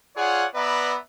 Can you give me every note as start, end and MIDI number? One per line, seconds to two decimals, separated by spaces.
0.16 0.45 65
0.16 0.45 68
0.16 0.45 73
0.16 0.45 74
0.16 0.45 78
0.54 0.95 59
0.54 0.95 71
0.54 0.95 74
0.54 0.95 76
0.54 0.95 82